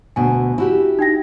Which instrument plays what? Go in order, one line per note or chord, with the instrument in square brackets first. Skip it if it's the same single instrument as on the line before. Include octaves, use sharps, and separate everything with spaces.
[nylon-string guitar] D2 B2 [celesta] G#5
[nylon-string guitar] E4 F#4 G4
[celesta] D#4 G5 A#6